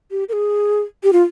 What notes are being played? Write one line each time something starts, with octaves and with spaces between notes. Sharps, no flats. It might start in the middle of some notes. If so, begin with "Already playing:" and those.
G4
A#4
G#4
G4
F4